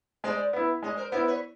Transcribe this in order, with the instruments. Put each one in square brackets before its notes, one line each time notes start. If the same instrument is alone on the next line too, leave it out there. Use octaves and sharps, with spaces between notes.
[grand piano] G#3 [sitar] C5 D5
[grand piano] B3 E4
[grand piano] G#3 [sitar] C#5 D#5
[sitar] A#4 C5
[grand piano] B3 E4 [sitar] A#4 C5
[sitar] B4 C#5